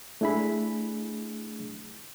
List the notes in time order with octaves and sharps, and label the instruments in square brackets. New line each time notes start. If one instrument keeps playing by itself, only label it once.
[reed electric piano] A3 D4 E4 G#4 B5